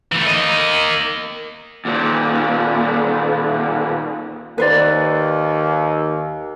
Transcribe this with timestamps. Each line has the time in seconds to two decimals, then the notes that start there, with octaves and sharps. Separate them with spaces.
0.12 E3 A3
0.27 A#3 D#5
1.85 D#2 A#2
4.58 D#2 B4 C5 D5